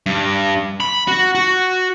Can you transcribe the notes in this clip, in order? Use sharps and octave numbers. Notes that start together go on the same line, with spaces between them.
G2
B5
F#4
F#4